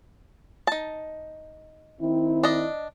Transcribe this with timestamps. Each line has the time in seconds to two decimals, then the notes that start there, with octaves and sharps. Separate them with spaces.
0.67 D#4 A5
2.01 D#3 C4 E4
2.43 D4 D#5